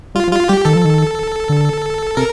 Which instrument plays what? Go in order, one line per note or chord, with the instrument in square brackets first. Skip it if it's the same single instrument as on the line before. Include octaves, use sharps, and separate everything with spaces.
[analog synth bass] G3 [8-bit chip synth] F4
[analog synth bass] F3
[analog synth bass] G3 [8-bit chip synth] F4
[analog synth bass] G3 [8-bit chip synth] G4
[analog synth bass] D#3 [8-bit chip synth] A4
[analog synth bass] F3
D#3
D3
[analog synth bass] C3 [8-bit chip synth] A#4